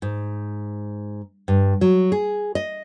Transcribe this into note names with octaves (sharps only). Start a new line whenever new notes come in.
G#2
G2
F#3
G#4
D#5